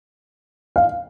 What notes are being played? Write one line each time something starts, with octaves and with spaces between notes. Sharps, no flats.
F5